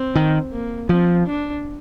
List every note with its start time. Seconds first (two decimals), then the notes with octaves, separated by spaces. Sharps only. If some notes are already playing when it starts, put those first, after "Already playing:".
Already playing: C4
0.16 D#3
0.53 A#3
0.89 F3 C4
1.26 D4